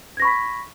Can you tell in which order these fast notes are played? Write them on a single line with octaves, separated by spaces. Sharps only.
G#6 A#6 C#6 B5 B6